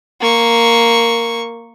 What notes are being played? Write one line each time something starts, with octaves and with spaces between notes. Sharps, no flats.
A#3 C#6